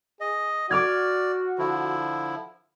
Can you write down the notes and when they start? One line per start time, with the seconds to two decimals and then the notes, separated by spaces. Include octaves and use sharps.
0.21 G#4 D#5
0.70 F#4 D5 D6 F6 G#6
1.59 D3 F3 E4